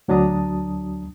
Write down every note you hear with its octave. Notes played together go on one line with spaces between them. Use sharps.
D2 F#3 D4 A5 A#5 D#6